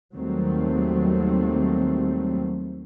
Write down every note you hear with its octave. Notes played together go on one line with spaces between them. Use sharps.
D#2 D#3 F#3 G3 A3 C4